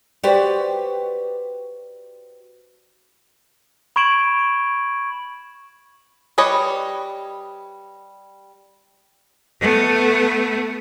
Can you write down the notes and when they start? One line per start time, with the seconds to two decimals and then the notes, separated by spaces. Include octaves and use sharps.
0.23 F#4 G4 B4 C5 D5
3.96 B5 C#6 G#6 D7 E7 F#7
6.38 G3 B4 C#5 D#5
9.60 A3 B3